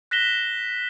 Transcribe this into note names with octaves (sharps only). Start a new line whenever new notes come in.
F#6 A#6 B6 E7 G7